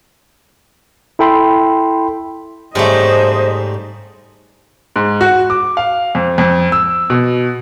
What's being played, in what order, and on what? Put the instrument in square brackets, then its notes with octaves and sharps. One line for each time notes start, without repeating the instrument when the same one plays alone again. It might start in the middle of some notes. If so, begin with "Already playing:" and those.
[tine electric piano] E4 A4 G5 B5 C6
[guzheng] G#2 A3 [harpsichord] C#3 G3 [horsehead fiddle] C5 D#5
[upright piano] G#2
F#4
D6
F5
F2
F2
E6
B2